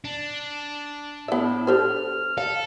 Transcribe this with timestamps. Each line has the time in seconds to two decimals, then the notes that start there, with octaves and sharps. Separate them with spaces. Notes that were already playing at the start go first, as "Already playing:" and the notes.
0.04 D4
1.28 A2 B3 E5
1.67 G4 A4 C5 F6
2.38 A4 F5